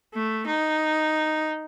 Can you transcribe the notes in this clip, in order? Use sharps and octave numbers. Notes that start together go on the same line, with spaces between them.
A3
D#4